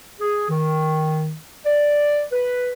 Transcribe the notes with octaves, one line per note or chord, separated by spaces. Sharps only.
G#4
D#3
D5
B4